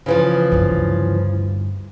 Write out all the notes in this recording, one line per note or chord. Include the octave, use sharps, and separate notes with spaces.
C#3 E3 F3
D2 G2